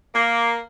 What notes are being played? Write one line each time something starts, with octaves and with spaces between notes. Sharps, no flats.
A#3